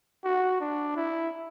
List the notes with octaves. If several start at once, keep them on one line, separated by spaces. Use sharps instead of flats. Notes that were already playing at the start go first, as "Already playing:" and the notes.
F#4
D4
E4